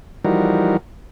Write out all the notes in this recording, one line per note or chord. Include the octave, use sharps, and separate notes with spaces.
E3 F3 G3 D#4 F#4 A#4